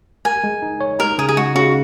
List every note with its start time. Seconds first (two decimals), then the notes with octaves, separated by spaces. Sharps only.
0.25 A#4 G#5
0.44 G#3
0.62 D#4
0.80 C#5
0.99 D#4 A#4
1.18 C#3 G#4
1.29 G#4
1.37 G#3 F#4
1.55 C#3 F#4